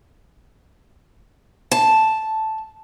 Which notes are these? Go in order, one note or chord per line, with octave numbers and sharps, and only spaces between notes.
A5